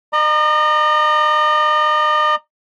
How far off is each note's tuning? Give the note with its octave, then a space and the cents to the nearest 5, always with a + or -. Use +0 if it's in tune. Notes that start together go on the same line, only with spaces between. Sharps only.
D#5 -40 A#5 +0 D6 +0